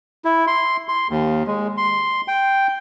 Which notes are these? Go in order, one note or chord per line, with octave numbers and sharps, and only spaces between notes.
E4
C6
C6
D#2
G#3
C6
G5